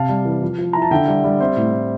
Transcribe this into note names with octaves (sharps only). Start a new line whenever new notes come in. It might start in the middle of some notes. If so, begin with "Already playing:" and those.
Already playing: C3 F5 A5
G3
E3
F3
F3
E4 A#5
A5
D3 E5 G5
G3
G3
C4 C5 E5
A2
A2